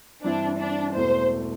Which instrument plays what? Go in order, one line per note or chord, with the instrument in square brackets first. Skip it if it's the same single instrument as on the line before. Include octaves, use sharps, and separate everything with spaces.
[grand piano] G2 E3 C4 E4 [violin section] D4
[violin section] D4
[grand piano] E1 E2 E3 A3 [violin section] C5